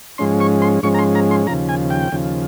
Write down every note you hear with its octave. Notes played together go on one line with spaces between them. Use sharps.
G#2 F3 G#3 C#4 C6
C#6
C6
G#2 F3 G#3 C#4 C#6
A#5
C6
A#5
C6
D#2 C#3 F3 A#5
G#5
G5
D#2 C#3 F3